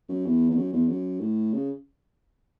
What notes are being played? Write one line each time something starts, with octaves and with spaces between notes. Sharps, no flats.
F#2
E2
E2
F#2
E2
F#2
A2
C#3